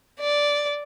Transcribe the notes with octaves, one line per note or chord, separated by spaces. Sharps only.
D5